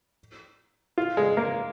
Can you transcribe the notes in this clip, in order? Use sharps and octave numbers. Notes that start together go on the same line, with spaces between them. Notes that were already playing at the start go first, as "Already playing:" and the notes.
F4
G#3
A#3